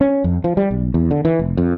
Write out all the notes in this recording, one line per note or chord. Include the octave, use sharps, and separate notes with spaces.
C#4
F2
F3
G3
B1
E2
D3
E3
F1
F2